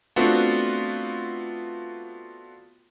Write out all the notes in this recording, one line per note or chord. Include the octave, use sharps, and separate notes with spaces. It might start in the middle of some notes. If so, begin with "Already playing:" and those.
A3 B3 C4 D4 F4 F#4